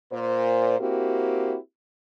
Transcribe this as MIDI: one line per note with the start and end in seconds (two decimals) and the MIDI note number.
0.12 0.78 46
0.12 0.78 72
0.80 1.57 58
0.80 1.57 60
0.80 1.57 64
0.80 1.57 66
0.80 1.57 67